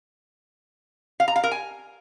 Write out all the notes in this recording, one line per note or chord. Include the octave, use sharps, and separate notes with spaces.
F5
A#5
F5
A#4
G#5